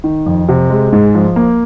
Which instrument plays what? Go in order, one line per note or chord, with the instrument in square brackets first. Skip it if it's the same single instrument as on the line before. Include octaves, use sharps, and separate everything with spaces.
[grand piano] D#3
F2
C3
G#3
G#2
F3
A#3